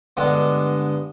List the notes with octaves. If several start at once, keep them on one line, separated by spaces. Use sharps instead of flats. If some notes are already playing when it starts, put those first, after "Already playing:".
G2 D3 G#3 B3 D4